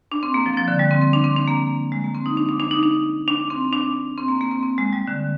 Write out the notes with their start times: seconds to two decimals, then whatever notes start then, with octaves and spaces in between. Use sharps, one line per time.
0.12 D4
0.23 C4
0.34 A#3
0.46 F3
0.57 F3
0.68 D3
0.79 G3
0.91 C4
1.02 C4
1.13 D4
1.24 C4
1.36 D4
1.48 A#3
1.92 G#3
2.04 A#3
2.15 C4
2.26 D#4
2.37 D4
2.49 D4
2.60 D4
2.71 D#4
2.83 D4
3.28 D4
3.50 C4
3.73 D4
4.18 C4
4.28 A#3
4.41 A#3
4.51 C4
4.63 C4
4.78 G#3
4.93 G3
5.07 D3